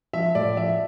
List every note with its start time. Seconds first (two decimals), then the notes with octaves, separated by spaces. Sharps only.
0.13 F3 E5
0.35 A2 D5
0.57 F3 E5